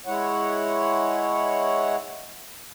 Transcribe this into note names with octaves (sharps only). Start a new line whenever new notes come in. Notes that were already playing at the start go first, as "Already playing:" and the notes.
G#3 E4 C#5 F#5